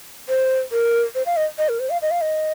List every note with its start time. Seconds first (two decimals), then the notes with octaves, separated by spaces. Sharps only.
0.29 C5
0.72 A#4
1.15 C5
1.26 F5
1.36 D#5
1.58 D#5
1.69 A#4
1.80 C5
1.90 F5
2.02 D#5
2.11 F5
2.21 D#5